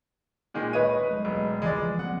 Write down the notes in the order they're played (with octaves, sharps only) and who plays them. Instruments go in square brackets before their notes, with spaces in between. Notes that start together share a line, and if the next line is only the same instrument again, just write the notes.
[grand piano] A#2 D#3 G#3
[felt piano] B4 D#5 D#7 [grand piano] C#5
[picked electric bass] F#3 G#3 A3
[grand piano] E1
[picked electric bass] C#3 E3 F3 [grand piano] G#3 D5
[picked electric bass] F#3 A#3 C4 [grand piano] F#5